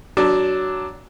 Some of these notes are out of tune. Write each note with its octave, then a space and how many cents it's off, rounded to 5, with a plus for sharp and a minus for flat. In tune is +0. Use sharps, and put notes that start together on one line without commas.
F#3 +15 D4 +0